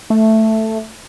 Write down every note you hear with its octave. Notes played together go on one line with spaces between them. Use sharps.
A3